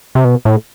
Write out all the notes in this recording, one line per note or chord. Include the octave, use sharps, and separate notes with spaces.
C3
B2
A2